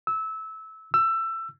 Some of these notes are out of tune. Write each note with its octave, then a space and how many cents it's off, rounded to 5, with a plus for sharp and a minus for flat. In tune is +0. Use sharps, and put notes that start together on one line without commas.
E6 -20
E6 +20